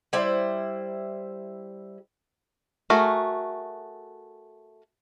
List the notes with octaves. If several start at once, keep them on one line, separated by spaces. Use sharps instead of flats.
G3 E4 C5
A3 F#4 G#4 A#4